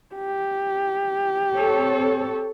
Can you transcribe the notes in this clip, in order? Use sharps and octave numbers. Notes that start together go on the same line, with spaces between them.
G4
C4 A4 C#5